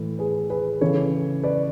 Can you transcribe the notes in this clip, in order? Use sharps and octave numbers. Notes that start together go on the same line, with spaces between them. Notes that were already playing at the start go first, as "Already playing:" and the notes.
Already playing: A2 E3 A4
G#4 B4
G#4 B4
C#3 E3 A4 C#5
B4 D5